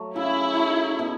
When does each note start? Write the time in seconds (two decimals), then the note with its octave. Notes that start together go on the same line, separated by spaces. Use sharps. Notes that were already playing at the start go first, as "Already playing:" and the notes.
Already playing: F#3 A3
0.16 C#3 E4
0.57 F#3 A3
0.99 B2